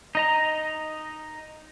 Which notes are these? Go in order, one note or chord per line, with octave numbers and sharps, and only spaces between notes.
D#4 D#5 A#5